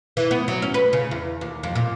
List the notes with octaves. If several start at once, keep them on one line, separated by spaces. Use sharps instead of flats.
E3
B3
F#3
C#4
B4
C#3
E2
D#2
F2
A#2